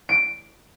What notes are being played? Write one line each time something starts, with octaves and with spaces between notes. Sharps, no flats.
D7